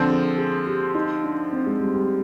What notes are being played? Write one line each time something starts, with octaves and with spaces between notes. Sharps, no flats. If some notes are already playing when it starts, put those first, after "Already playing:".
Already playing: D3 F3 C4
G#4
G#4
G4
D#4
D4
C4
G#3
G3
G3